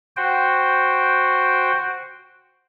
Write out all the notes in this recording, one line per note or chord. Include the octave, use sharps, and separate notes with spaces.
F#4 C5 G5